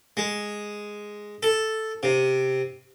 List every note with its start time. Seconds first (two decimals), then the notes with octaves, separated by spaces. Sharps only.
0.17 G#3
1.43 A4
2.03 C3